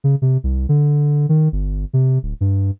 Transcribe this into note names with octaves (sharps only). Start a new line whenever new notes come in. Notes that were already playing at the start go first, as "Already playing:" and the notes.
C#3
C3
C2
D3
D#3
G1
C3
D1
G2